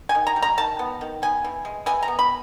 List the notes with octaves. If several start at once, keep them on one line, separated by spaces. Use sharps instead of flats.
G#5
D#3
A#5
G3
A#5
D#3 A5
B3
D#3
B3 G#5
E3
G#3
E3 G#5
A#5
B3
B5